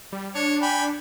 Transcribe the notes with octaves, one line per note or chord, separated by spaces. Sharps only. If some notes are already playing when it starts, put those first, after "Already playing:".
G3
D4 C#5
G5 G#5 B5